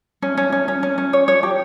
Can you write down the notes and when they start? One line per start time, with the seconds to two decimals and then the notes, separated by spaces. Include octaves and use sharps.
0.22 C#4
0.37 C#4
0.52 C#4
0.68 C#4
0.83 C#4
0.98 C#4
1.13 C#5
1.28 C#5
1.43 G4